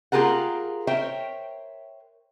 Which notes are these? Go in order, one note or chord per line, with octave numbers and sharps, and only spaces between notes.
A#3 F4 G4 G#4 A#4 F#5
A#4 C5 C#5 E5 G5